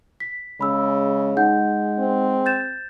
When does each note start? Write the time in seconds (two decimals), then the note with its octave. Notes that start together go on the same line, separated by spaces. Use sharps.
0.20 B6
0.61 C#3 G#3 B5 E6
1.37 G#3 D#4 F#5 G6
1.99 C4
2.46 G6 A6 E7